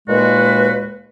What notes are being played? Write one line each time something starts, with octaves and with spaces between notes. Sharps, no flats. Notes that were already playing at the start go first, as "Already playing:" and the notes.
D#2 A#2 G#3 A#3 F#4 B4